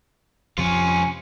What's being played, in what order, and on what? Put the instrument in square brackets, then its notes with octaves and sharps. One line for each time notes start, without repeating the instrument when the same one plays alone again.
[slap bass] F2 C3 F3 [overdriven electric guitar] C#4 F4